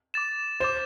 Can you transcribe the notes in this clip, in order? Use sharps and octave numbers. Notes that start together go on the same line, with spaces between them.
D6 A6 E7
C5 D6 A6 E7